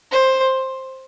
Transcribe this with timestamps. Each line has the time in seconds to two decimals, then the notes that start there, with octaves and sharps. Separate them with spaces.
0.11 C5